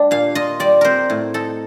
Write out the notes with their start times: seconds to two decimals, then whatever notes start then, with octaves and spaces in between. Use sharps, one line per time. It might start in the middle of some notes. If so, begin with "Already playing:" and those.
Already playing: G3 D4
0.11 A#2 F5
0.35 F4 D#5
0.60 G3 D5
0.81 C4 A#4 C5
1.10 A2
1.34 D#4 A4